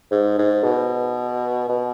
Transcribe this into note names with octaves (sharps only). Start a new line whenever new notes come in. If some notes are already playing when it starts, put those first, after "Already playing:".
G#2
G#2
B2
B2